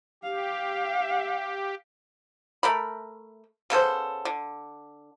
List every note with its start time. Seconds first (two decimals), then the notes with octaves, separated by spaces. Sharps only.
0.23 G4 F5
2.63 A3 A#4 B5
3.70 C#3 B3 A4 C5
4.25 D3